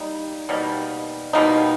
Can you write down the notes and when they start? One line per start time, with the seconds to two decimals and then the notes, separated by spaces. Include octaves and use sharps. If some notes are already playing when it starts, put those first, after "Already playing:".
Already playing: G3 A#3 D#4
0.49 B2 G3 A#3 D#4
1.33 B2 G3 A#3 D#4